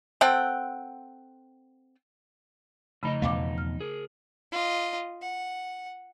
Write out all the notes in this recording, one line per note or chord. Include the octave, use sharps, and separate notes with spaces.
C4 A4 F#5 G5
F2 C#3 A3 D#4 D#5 B5
E2 B2 A3 F5 D6
F6
G#4 A#4
F4 D#5
F#5